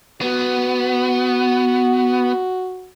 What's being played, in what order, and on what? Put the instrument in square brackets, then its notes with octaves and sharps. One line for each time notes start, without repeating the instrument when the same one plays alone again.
[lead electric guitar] B3 [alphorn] F#4